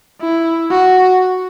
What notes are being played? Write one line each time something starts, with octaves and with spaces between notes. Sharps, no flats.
E4
F#4